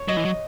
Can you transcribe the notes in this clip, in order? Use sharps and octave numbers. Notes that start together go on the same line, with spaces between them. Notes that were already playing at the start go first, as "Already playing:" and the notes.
Already playing: C#5
F#3 D#5
E3
F#3